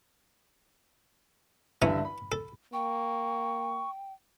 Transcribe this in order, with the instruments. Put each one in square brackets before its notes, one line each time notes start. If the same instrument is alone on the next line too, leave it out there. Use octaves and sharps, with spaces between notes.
[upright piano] G2 D3 E5 [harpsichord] E3 C#4 A#5
[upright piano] B5
[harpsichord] A4
[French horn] A#3 [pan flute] G5 [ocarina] C#6